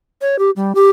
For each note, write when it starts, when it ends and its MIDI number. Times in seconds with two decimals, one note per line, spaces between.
0.21 0.39 73
0.39 0.50 67
0.56 0.72 55
0.75 0.90 67